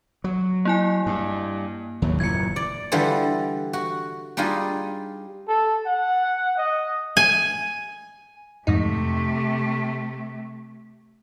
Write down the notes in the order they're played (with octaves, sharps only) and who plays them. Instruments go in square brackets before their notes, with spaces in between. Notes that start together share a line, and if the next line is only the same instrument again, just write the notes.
[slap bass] F#3
[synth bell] A#3 E4 G#5
[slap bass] G2
D#2 A2 F#3
[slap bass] F#1 A#2 E3 [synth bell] G#6 C#7
[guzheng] D5
D3 E3 G3 F4 A4
F#4
G3 D4 D#4 F4 G#4
[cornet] A4
F#5
D#5
[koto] G#5
[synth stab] F2 G#2 D#4 [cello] C3 A3